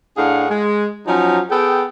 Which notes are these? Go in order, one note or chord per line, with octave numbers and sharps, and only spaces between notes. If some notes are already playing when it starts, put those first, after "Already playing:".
A2 D4 G#4 F5 F#5
G#3
F3 F#3 C#4 D#4
B3 G#4 A4 G5